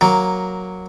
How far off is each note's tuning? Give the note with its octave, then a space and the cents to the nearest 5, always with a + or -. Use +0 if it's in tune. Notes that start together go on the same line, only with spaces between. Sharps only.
F#3 +0 A#3 +0